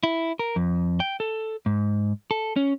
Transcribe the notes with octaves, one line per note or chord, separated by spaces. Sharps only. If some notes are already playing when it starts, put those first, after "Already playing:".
E4
A#4
F2
G5
A4
G#2
A4
C#4